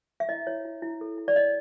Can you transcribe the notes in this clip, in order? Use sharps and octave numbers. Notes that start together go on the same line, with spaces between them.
E5
E4 D#5
E4 C#5
E4
E4
A4
E4
D5
C#5 D#5